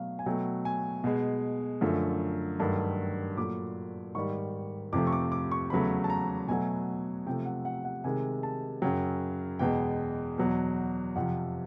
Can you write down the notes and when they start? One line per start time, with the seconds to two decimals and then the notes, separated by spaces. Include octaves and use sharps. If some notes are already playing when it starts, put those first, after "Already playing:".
Already playing: B2 F#3 A3 F5
0.19 G#5
0.26 B2 F#3 A3 G5
0.65 G#5
1.04 B2 G#3
1.81 F#2 D3 F3 A3
2.60 G2 D#3 F#3 A3 A5
3.37 A#2 F#3 A3 D6
4.15 G#2 D#3 G3 C#6
4.93 F2 C3 F3 A3 D6
5.07 C#6
5.12 D6
5.32 D6
5.52 C#6
5.70 E2 C#3 F#3 A3 B5
6.04 A5
6.10 A#5
6.48 B2 F#3 A3 G#5
7.26 C3 F3 A3 G5
7.45 F#5
7.65 F#5
7.85 F#5
8.04 C3 D#3 G#3 G#5
8.43 A5
8.82 F#2 C#3 F#3 G5
9.59 E2 B2 G#3 G5
10.38 E2 B2 F#3
11.16 F2 C3 F3 F#5